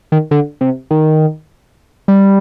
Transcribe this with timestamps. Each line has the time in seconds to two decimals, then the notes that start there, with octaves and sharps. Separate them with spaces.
0.12 D#3
0.31 D3
0.61 C3
0.91 D#3
2.08 G3